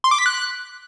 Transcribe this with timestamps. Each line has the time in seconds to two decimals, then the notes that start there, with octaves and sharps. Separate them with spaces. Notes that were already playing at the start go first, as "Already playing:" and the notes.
0.04 C6
0.11 D6
0.19 B6
0.26 F#6